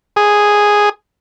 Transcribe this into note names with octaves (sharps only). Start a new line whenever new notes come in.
G#4